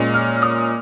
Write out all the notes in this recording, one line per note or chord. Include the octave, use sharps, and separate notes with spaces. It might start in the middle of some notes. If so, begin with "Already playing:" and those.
Already playing: A#2 G#3 C#4
F6
D#6